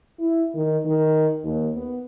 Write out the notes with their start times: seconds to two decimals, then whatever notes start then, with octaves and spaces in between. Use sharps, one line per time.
0.19 E4
0.54 D#3
0.85 D#3
1.44 D#2
1.76 B3